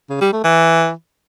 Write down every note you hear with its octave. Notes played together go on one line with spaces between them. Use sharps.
C#3
G3
A3
E3